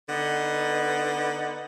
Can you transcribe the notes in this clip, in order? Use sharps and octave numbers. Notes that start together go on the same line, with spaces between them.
D3 B3 D#4 B4 F#5